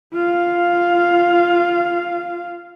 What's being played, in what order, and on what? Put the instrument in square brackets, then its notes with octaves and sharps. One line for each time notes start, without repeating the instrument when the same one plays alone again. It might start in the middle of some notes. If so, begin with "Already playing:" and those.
[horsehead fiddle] F4 F5